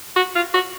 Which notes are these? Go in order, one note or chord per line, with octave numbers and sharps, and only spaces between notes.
F#4
F4
F#4